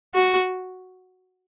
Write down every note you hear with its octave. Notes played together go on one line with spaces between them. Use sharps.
F#4